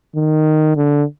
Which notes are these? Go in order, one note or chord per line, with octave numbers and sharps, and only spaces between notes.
D#3
D3